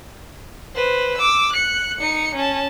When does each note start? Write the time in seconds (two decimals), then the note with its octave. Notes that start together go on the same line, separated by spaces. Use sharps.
0.75 B4 C5
1.18 D6 E6
1.52 F#6 C#7
1.98 D#4 C#7
2.35 C#4 A5